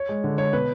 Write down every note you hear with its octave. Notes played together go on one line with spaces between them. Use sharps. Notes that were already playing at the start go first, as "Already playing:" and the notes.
Already playing: C#5
G#3
D3
G#3 C#5
B2 B4